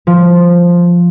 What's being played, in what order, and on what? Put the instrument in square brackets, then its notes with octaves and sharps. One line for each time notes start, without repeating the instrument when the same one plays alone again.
[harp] F3